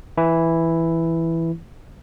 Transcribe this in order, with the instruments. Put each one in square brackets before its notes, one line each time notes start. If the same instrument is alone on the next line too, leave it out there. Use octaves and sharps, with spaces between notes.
[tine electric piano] E3 E4